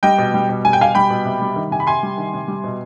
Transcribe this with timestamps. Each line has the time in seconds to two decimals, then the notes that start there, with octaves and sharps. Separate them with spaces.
0.03 G3 D#5 G5
0.18 B2
0.34 G3
0.49 B2
0.64 G3 G#5
0.73 G5
0.79 B2 F5 G#5
0.95 G3 G5 B5
1.10 B2
1.25 C3
1.41 G3
1.56 D#3
1.71 C3 G#5
1.80 B5
1.87 C3 G#5 C6
2.03 G3
2.18 D#3
2.34 C3
2.48 G3
2.64 B2